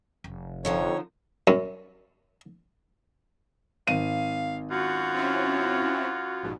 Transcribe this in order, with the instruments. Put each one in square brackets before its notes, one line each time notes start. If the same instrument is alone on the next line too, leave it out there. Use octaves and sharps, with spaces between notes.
[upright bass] F1
[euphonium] F2 [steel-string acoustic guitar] D3 F3 D#4 [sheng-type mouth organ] C#5
[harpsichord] F#2
[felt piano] G#1 D#7 [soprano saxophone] F5
[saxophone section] F#2 F4 [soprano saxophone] F#4
[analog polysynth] C4 C#4 E4
A#1 G#2 B2